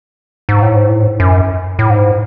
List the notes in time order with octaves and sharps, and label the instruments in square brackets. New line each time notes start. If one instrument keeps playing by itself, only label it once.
[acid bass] G#2
A2
G#2
A2
G#2
F#2
A2
G#2